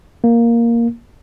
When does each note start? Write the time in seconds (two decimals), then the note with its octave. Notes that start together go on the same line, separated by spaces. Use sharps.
0.24 A#3